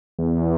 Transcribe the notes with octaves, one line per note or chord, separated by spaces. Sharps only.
E2